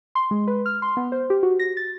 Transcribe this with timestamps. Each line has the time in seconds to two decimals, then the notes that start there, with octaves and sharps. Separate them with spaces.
0.15 C6
0.31 G#3
0.48 B4
0.66 F6
0.82 C6
0.97 B3
1.12 C5
1.30 G4
1.43 F#4
1.59 A#6
1.77 A6